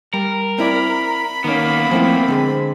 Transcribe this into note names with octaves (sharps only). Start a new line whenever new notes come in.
G3 A#4
C4 E4 D5 B5
D#3 A#3 B3 C#4
F3 A3 C4 E4
D3 G#3 G#4